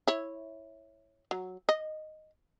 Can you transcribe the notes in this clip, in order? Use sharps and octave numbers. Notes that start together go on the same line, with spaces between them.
E4 C#5
F#3
D#5